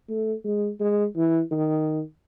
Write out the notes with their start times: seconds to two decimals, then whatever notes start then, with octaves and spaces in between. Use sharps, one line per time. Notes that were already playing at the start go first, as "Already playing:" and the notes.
0.09 A3
0.44 G#3
0.80 G#3
1.16 E3
1.51 D#3